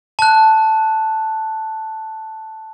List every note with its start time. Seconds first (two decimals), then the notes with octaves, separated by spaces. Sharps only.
0.19 A5 F#6